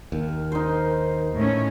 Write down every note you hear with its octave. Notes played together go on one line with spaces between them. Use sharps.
D#2 A#4
D#4 C5
A2 C#4